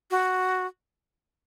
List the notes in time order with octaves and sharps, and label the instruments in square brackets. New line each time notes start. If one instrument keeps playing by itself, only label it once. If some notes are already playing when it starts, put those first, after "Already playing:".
[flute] F#4